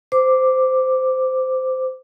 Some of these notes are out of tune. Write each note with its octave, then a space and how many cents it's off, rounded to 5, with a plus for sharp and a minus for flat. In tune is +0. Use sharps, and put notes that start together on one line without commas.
C5 -15 D6 +0